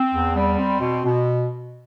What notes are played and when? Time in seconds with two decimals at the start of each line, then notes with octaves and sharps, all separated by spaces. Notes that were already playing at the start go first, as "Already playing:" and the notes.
Already playing: C4
0.13 E2
0.36 G3
0.58 C4
0.81 B2
1.04 B2